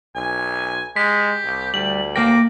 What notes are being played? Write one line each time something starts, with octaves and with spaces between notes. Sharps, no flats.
B1 G#5
G#3 G4 B6
C2
D2 G3 F#7
A#3 A#4 G5 D6 A#6